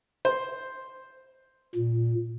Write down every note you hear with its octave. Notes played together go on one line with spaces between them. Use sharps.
C5
A#2